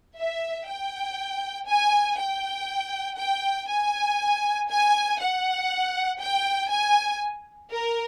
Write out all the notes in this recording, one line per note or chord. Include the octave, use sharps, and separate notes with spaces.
E5
G5
G#5
G5
G5
G#5
G#5
F#5
G5
G#5
A#4